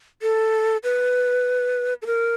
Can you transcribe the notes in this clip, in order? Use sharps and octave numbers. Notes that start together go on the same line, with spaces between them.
A4
B4
A4
A#4